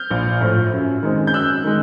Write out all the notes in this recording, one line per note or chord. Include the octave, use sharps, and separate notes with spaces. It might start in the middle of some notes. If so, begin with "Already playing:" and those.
Already playing: F6 G6
A#1
A2 F3
F#2
D#3 G#3 C4
G6
F#2 E6 F#6
D#3 G#3